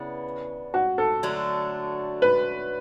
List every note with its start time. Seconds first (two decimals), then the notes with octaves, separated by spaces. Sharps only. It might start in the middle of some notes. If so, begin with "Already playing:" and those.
Already playing: C#3 E3 B3 D4
0.74 F#4
0.98 A4
1.23 D3 F#3 A3 D4
2.22 B4